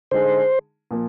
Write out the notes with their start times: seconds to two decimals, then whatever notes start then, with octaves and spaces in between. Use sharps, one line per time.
0.11 D3 G#3 D#4 G#4 C5
0.91 A#2 F3 A#3